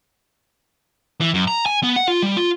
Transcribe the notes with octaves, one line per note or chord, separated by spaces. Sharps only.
E3
F#2
A#5
G#5
B3
F#5
F4
G3
F4